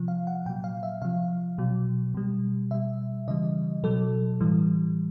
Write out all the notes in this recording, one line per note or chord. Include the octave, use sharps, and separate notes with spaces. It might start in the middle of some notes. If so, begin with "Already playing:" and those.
Already playing: C3 F3
F5
F#5
A#2 F#3 G5
F5
E5
C3 F3 F5
B2 F#3
B2 G3
B2 G3 E5
C#3 E3 G3 D#5
B2 F#3 A4
A2 E3 G3